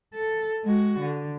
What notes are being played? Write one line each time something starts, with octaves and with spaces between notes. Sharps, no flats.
A4
G#3 F#4
D3